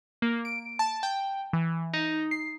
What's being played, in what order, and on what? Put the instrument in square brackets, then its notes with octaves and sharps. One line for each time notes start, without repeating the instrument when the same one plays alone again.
[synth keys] A#3
D7
A5
G5
E3
D#4
C7